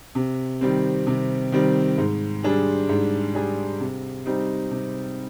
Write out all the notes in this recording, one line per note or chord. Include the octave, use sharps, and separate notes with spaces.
C3
D#3 G3 C4
C3
D#3 G3 C4
G#2
G3 D4 G#4
G#2
G3 D4 G#4
C3
G3 C4 D#4
C3